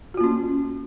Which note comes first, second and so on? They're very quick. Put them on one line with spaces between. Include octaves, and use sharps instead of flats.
F#4 F4 A#3 C#4